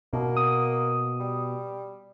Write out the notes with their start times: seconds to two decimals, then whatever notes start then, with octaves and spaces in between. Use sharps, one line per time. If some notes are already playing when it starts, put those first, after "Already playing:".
0.13 B2 A#3
0.37 D#6
1.20 G3